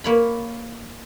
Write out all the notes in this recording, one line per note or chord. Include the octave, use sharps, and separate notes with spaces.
A#3 C#5 B5